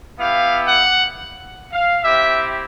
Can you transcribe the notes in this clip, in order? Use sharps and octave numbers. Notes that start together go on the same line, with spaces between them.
B3 E4 G4 F5
F#5
F5
C4 E4 G4 E5